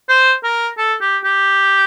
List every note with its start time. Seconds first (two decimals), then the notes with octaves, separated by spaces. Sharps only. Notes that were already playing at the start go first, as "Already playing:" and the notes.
0.09 C5
0.44 A#4
0.78 A4
1.01 G4
1.24 G4